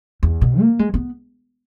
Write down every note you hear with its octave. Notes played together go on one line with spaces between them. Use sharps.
E2
B2
A#3
G#3
B3